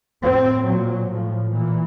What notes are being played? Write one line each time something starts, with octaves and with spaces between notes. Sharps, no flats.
A2 C4
A#2 F#3
A2 F3
A#2 E3